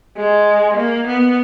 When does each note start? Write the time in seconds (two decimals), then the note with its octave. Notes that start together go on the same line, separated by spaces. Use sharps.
0.17 G#3
0.77 A#3
1.08 B3